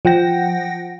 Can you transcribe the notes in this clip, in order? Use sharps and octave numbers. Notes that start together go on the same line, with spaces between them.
F3 F#5 G5 A#6